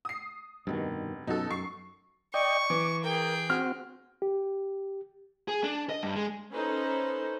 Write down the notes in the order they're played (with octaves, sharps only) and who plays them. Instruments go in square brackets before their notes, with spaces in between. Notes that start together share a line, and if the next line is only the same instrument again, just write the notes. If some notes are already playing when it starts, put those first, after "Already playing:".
[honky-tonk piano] D#6 C7
[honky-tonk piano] F1 [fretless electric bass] G2 B2 D#3
[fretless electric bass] F#2 B2 [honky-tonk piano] D#4 F#4 A4
[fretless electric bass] F#2 [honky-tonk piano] C#6 C7
[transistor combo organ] D5 D#5 G5 [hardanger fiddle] C#6
[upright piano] E3 [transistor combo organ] D6
[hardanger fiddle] G#4 G5 [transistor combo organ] A#4
[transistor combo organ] C4 F#4 [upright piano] F6
[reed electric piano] G4
[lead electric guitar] G#4
D4
D#5
G2
G#3
[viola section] C#4 D#4 A4 B4 C5